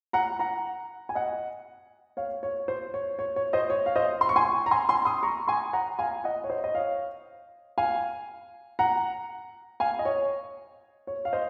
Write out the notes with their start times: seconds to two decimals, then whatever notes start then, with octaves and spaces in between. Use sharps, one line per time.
0.13 F#5 A#5
0.39 F#5 A#5
1.09 G#5
1.15 D#5 F#5
2.17 C#5 F5
2.43 C#5
2.68 C5
2.94 C#5
3.19 C#5
3.36 C#5
3.53 C5 D#5
3.70 C#5
3.86 F5
3.96 C5 D#5
4.21 C6
4.29 C#6
4.36 G#5 C6
4.66 A#5
4.71 G#5 C6
4.89 G#5 C6
5.05 C6 D#6
5.23 A#5 C#6
5.48 G#5 C6
5.73 F#5 A#5
5.99 F5 G#5
6.24 D#5 F#5
6.44 C#5
6.50 C5 D#5
6.64 D#5
6.75 C#5 F5
7.78 F5 G#5
8.79 F#5 A#5
9.80 F5 G#5
9.99 D#5
10.05 C#5
11.07 C#5
11.25 F5
11.33 C5 D#5